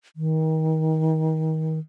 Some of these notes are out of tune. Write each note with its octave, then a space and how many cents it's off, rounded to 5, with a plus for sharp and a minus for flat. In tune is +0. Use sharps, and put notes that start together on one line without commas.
D#3 +30